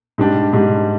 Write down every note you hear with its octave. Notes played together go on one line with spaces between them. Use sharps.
G#2 G3 D4 G4
G#2 G3 D4 G4